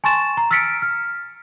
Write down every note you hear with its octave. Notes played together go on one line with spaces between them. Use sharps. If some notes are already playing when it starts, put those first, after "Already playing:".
G#5 A5 C6 C#6 A6 E7
A#5
E6 F6 A6 B6 C#7 D7
F6